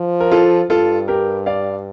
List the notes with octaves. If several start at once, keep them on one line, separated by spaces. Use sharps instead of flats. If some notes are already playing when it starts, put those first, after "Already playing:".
Already playing: F3
A#4
F4 A4
G2 F4 A4
G4 A#4
D5 F5